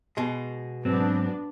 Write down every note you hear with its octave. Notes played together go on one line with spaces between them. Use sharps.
B2 G#3
G#2 F#3 B3 C4 D4